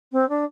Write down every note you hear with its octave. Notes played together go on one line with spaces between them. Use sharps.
C4
D4